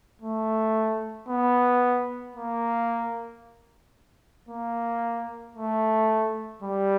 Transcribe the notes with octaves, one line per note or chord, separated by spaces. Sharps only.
A3
B3
A#3
A#3
A3
G3